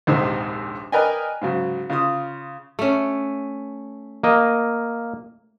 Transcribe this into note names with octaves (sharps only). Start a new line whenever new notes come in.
A#1 D#2 G#2 C3 D#3
A#4 B4 D5 D#5 G5 G#5
G#2 C#3 F#3
C#3 F4 D#6
A3 C#4
A#3 D#5